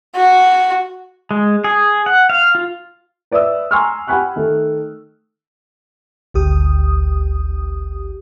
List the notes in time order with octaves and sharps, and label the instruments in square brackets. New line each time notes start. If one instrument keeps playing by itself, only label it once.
[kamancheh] F#4
[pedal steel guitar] G#3
G#4
F#5
F5
F4
[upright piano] B4 D5 E5 D#6 E6
G#5 A#5 C6 C#6 E6 F6
G4 F#5 G#5 B5 C#6 F#6
D#3 A3 A4
[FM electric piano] G#1 D2 G4 D#6